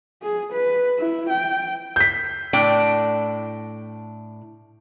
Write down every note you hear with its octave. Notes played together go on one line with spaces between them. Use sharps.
G#4
B4
E4
G5
G6 B6
A2 D4 G5